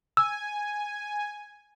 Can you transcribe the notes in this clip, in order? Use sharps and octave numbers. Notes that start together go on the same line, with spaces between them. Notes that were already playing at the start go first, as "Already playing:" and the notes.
G#5 E6